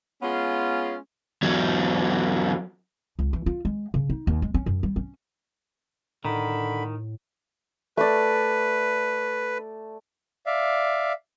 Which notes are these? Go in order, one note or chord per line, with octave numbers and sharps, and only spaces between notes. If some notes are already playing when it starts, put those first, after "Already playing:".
G#3 B3 C#4 F4
E2 F#3
C#2
E3
F4
G#3
C#3
D#4
D#2
G#3
C#4
F#2
G3
C#4
A2 D3 D#3 B5
A3 B4 D5
D5 E5 F5